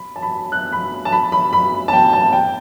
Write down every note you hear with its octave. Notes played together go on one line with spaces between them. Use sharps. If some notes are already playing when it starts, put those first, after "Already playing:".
Already playing: B5
A5
B5
F#6
B5
A5
B5
B5
B5
A5
G5
A5
G5